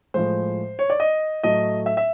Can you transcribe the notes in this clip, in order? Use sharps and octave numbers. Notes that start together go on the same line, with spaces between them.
A2 F3 G#3 C5
C#5
D5
D#5
A2 F#3 A3 D#5
E5
E5